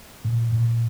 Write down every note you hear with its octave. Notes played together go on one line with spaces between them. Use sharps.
A#2
A#2